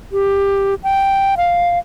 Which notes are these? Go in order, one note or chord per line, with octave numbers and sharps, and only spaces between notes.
G4
G5
F5